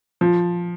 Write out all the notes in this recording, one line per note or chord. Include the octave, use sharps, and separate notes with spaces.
F3